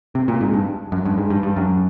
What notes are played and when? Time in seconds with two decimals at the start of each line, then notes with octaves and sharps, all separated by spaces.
0.15 C3
0.28 A#2
0.41 G#2
0.54 G2
0.92 F#2
1.05 G2
1.18 G#2
1.30 G2
1.43 G2
1.56 F#2